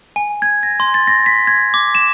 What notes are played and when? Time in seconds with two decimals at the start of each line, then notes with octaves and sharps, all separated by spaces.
0.16 G#5
0.42 G#6
0.63 A#6
0.80 C6
0.94 A6
1.07 A#6
1.26 B6
1.47 G#6
1.74 D6
1.95 E7